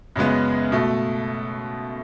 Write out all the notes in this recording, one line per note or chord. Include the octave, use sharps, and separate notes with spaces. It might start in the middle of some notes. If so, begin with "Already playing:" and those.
F#2 C#3 G#3 B3
B2 A3